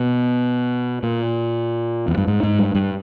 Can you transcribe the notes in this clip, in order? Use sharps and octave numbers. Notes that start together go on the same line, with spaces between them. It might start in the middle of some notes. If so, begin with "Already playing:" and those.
Already playing: B2
A#2
E2
G2
G#2
G#2
G2
G2